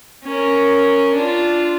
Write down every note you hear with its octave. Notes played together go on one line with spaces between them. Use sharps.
C#4 A#4
D4 F4